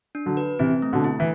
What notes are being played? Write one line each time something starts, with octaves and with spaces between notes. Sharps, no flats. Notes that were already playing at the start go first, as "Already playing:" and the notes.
D4
D3 F#3
B4
C3 E3 C4
A3
B2 D3
E4
E3